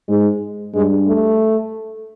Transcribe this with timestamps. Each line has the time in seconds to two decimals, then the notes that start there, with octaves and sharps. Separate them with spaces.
0.09 G#2 G#3
0.75 G2 G#3
1.07 A3